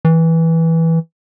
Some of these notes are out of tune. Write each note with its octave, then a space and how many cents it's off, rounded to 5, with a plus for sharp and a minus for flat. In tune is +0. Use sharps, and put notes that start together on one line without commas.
E3 -10